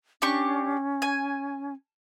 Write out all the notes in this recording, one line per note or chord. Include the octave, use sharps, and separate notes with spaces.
C#4 D4 G4 C#6
G#5